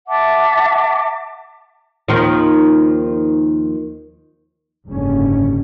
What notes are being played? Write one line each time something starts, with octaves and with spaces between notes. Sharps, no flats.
E5 F#5 A5 D6
D#2 D#3 F3
F#1 G#2 D3 G3 C#4